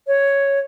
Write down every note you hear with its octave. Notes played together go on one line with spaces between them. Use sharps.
C#5